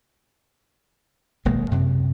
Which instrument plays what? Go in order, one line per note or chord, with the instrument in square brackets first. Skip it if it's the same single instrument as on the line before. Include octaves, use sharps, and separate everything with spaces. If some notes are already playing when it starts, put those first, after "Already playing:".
[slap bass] D#1 B1 G#3 A#3
F#2 C3